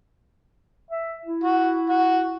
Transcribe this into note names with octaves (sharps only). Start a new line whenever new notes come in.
E5
E4
F#4
F#4